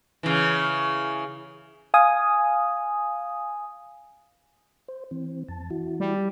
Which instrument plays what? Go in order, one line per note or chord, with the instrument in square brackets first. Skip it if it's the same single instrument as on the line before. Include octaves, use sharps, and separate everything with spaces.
[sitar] C#3 E3
[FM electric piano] F5 G#5 D#6
[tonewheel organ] C5
E3 C4
F2 A5
E3 E4 F#4
[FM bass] G3